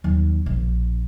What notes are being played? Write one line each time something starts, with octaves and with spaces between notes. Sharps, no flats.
D#2 F#3
A#1